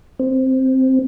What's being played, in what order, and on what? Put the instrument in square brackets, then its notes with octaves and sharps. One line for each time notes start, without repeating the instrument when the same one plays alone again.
[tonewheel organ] C4